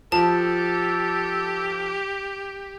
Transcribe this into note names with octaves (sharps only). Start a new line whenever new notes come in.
F3 G4 A4 A5